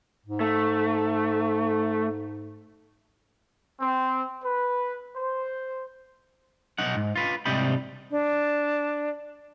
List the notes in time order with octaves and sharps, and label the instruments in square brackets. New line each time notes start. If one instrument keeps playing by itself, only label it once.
[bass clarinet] G#2
[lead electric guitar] A3
[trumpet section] C4
B4
C5
[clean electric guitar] B1 D#4 F#5
G#2
F4 B4
G#2 C3 G3 D#5 G5 B5
[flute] D4